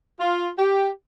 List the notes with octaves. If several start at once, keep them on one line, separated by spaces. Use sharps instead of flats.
F4
G4